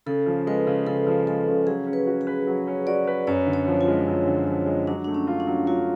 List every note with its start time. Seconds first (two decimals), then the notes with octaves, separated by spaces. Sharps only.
0.06 C#3 A4
0.26 F3
0.47 G#3 B4
0.67 C#3
0.87 C#3 A4
1.07 F3
1.27 G#3 A4
1.48 C#3
1.66 F#3 G#4
1.87 C#4
1.93 B4
2.06 F#4
2.21 G#4
2.27 B4
2.47 F#3
2.67 C#4
2.87 F#4 D5
3.07 B4
3.27 F#2 C#5
3.47 D3
3.53 C#5
3.67 F3
3.81 F4
3.88 G#3
4.07 F#2
4.27 D3
4.47 F3
4.67 G#3
4.87 F#3 D4
5.04 A3 D4
5.14 C#4
5.27 F4
5.40 D4
5.47 F#3
5.67 F#3 F4